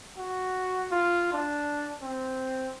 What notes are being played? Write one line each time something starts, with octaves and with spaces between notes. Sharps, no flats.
F#4
F4
D4
C4